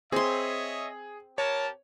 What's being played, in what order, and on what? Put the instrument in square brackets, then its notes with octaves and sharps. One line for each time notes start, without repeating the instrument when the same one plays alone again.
[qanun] C4 C6 [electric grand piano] G#4 [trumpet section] C#5 D#5 E5
[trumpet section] G4 A#4 A5 [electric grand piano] C#5